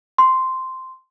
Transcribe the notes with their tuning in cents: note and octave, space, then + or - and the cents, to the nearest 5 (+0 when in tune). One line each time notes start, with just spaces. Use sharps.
C6 -5